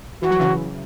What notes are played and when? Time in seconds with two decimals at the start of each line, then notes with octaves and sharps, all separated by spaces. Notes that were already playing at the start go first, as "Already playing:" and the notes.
0.22 E3 F#4
0.31 F#3
0.40 C#3 E3